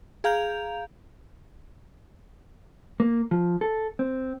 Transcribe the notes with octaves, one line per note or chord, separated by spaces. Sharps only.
G#4 F5 A#5 G6 F7
A#3
F3
A4
C4